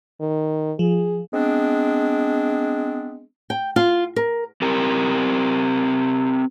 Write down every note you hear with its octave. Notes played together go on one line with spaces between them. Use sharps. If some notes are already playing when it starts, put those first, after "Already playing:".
D#3
F3 G#4
G#3 B3 C4 D4
G5
F4
A#4
C4 G4 A#4